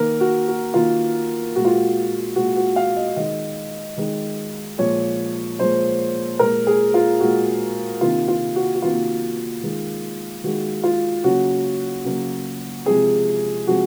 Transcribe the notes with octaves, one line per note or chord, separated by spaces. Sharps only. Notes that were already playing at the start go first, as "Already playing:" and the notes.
Already playing: D#3 A#3 A#4
F#4
F#4
D#3 A#3 F4
A#2 G#3 F#4
F4
F#4
A#2 G#3 F#4
F#4
F5
D#5
D#3 G#3 D#5
D#3 G#3
A#2 F3 G#3 C#5
A#2 F3 G#3 C5
A#2 G#3 A#4
G#4
F4
A#2 G#3 F#4
C3 D#3 A#3 F4
F4
F#4
F#4
C3 D#3 A#3 F4
D#3 G#3
D#3 G#3 F#4
F4
C#3 F#3 A#3 F#4
C#3 F#3 A#3
C3 F3 G#3 G#4
C3 F3 G#3 F#4